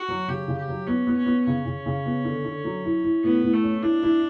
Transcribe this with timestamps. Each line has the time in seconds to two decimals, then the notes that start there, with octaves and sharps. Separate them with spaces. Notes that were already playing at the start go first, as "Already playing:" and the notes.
Already playing: F#4
0.09 F#3
0.28 C#3 G4
0.48 C#3
0.58 G4
0.68 F#3
0.87 B3 C#4
1.07 B3
1.17 C#4
1.26 B3
1.46 C#3 C#4
1.65 C#3
1.86 C#3
2.06 B3
2.24 D3
2.45 D3
2.64 F#3
2.85 E4
3.04 E4
3.24 A2 B3
3.43 A2
3.53 A3
3.63 C#4
3.82 D4 E4
4.03 E4